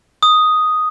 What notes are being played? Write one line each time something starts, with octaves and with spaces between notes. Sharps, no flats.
D#6